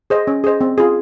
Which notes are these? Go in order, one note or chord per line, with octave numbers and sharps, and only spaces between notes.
G#4 C5 D#5
C#4
G#4 C5 D#5
C4
F4 G#4